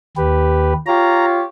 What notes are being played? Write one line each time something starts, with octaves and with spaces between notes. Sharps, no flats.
D#2 G4 B4
F4 G4 C#5 A#5